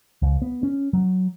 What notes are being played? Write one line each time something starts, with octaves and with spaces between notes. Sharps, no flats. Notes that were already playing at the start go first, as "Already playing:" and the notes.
C#2
B3
C#4
F#3